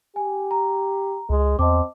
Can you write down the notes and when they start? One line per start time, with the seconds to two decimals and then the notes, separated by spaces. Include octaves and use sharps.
0.16 G4 G#5
0.51 A#5
1.29 C#2 G#3
1.59 E2 C4 D#5 A5 D6